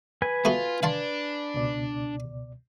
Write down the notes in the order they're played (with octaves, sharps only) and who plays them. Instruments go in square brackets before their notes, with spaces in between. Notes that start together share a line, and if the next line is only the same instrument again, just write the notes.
[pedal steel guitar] B4 G#5
[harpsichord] A3 B3 F#4 [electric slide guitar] F4
[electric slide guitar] D4 [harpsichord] F5 A5 C6
[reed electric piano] C#2 B2 D5